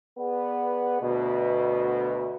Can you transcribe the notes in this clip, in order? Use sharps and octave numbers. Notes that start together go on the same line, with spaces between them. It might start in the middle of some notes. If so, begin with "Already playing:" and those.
B3 G#4 B4 D5 F#5
D2 B2